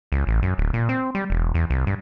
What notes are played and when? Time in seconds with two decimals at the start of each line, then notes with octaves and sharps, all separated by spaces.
0.12 C#2
0.27 A1
0.42 F#2
0.58 D1
0.74 A#2
0.89 C4
1.15 G3
1.30 E1
1.54 E2
1.70 C2
1.87 G2